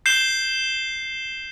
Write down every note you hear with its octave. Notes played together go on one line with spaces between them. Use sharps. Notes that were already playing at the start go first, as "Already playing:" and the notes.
G6 C7 E7 G7